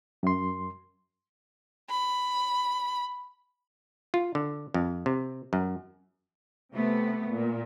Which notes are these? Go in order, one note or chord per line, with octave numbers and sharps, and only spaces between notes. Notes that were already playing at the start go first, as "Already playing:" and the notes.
F#2 C6
B5
F4
D3
F2
C3
F#2
C3 A3 B3
A#2